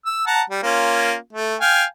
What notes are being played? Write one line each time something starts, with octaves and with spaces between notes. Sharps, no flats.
E6
F#5 A5 A#5
G3
A#3 C#4 F4
A3
F5 G5 G#5